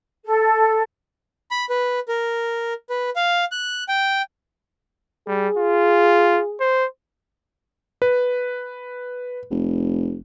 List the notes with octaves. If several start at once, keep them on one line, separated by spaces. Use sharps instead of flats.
A4
B5
B4
A#4
B4
F5
F#6
G5
G3 G#4
F4
C5
B4
F1